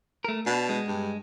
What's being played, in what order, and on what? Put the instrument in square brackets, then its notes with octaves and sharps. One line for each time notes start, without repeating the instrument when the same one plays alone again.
[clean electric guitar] A3 A#4
[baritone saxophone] B2 [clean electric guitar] D4
[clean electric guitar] G#3
[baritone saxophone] G2